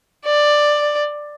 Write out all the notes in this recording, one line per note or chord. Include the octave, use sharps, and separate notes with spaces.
D5